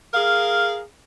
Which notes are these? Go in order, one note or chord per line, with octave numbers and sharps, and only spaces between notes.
G#4 A#4 F5